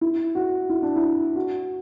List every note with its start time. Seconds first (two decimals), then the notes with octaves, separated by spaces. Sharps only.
0.01 E4
0.35 F#4
0.69 E4
0.82 D4
0.96 E4
1.36 F#4